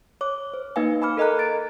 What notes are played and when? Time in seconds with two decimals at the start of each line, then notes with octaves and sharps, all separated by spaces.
0.21 C#5 D6
0.54 C5
0.76 A#3 D#4 B4 F5 G#5
1.02 G#5 B5 D6 F6
1.17 A4 A#4 D#5 G#5 A#5 F#6
1.39 A6 D7